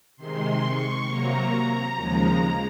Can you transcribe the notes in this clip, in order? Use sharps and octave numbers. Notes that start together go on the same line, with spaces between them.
C3 D#3 G#3 C6
C#6
C3 F#3 A#3 A#5
D#2 C#3 F3 G#3 A#5